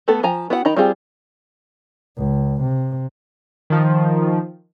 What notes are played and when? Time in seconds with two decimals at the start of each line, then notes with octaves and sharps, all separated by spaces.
0.08 A3 B3 A4
0.23 F3 G#5 A#5
0.50 B3 E4 F#4 F#5
0.65 D#3 D#4 A#5 B5
0.77 G3 C4 F4 G#4
2.17 C#2
2.61 C3
3.70 D#3 F3